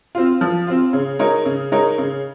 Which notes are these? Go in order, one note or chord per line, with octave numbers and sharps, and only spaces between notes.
C4 F4
F3
C4 F4
C#3
G#3 D#4 A#4 C#5
C#3
G#3 D#4 A#4 C#5
C#3